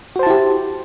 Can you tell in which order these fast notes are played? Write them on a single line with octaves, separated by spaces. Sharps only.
F#4 C5 A5 E4 G4